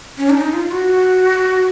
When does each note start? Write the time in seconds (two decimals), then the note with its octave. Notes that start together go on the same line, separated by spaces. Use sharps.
0.18 C#4
0.30 D#4
0.37 C#4
0.41 D#4
0.53 F4
0.71 F#4